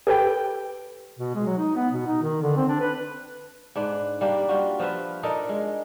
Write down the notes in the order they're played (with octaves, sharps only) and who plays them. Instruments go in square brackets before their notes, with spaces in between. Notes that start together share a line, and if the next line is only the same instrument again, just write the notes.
[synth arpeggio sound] G4 A4 B4 G5
[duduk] B2
G#3
F#3
D#4
B3
B2
D#4
D#3
D3
C4
D4
B4
[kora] G#2 D4 B4
G3 A#3 D4
G3 F4 F#4
F3 F4 B4 E5
D4 D#4 A4 A#4
G#3